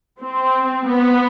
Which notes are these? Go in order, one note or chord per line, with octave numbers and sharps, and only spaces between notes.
C4
B3